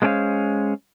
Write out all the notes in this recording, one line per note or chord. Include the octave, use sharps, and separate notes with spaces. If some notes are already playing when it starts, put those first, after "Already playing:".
G#3 A#3 C#4 D4 C5 F5